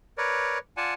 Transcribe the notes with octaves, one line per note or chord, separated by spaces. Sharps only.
A#4 B4 C#5 D5
F4 D5 F#5 G#5 A5